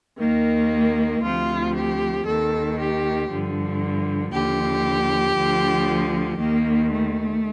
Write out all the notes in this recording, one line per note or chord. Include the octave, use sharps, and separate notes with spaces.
D#2 D#3 A#3
D2 C3 F3 F4
G4
D#2 D#3 A4
G4
G2 D3 F3
D#2 D3 F3 G4
D2 D3 F3
D#2 D#3 A#3
A3